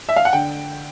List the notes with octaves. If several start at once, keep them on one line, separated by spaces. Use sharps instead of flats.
E5
F5
F#5
D3 G5